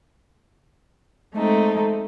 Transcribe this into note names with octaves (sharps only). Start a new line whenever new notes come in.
G#3 A3 C4 D#4 A4